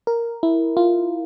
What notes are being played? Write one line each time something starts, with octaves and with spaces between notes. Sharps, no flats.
A#4
E4
F4